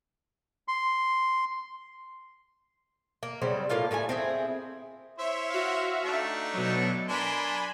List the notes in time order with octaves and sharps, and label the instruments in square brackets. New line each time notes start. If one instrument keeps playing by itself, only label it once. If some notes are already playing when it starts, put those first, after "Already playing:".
[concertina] C6
[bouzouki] A#3
C#3 F#3 G3 C4
A2 A#3 F4 F5
A2 G3 A3 G#5
C4 E4 G#4
[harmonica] E4 C5 C#5 [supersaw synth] E5
[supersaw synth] F#4 E5 F5
[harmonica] A3 D4 D#4
[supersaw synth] B2 F#3
[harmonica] D4 A#4 C6 [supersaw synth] G#5 B5